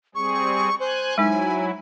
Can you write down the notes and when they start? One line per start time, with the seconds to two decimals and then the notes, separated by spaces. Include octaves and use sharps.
0.15 G3 C4 G#4 C#6
0.80 C5 G#5 F#6
1.18 F#3 G#3 D#4 E4 G#5